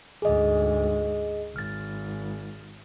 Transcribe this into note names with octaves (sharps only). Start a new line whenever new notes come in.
D2 G#2 G#4 D#5
G#1 F6 A6